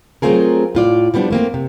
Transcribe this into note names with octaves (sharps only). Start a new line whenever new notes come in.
F#3 A3 C4 F4 G#4 A#4
A2 F4 D5
F3 G3 B3 C#4 D4
A3 A#3 C4
C3